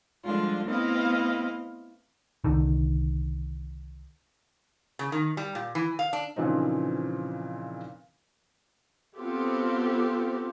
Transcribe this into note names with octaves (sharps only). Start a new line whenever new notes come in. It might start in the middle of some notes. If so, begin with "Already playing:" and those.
D3 F3 G3 G#3 D4 F4
A3 B3 C4 E4 D#5 F5
C2 D3 D#3
C#3
D#3
G3
A#2
E3
F5
D4
A#2 C#3 E3 F3 C4 D#4
B3 C4 F4 G4 A4